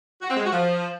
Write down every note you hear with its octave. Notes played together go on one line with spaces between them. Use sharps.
F#4
C4
G#3
F#4
F3